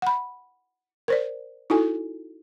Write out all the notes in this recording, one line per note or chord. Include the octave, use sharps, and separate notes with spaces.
F#5 B5
A#4 C5 D5
D#4 E4 F#4 A4 G#5